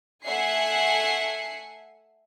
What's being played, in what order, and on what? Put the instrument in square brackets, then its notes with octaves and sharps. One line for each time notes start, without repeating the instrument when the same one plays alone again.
[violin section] A3 E5 F#5 G#5 C7 C#7